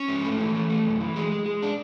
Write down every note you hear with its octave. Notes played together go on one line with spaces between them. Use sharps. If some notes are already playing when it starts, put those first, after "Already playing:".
Already playing: C#4
G#2
A3
E3
A3
A3
F#2
E3
G#3
G#3
G#3
D4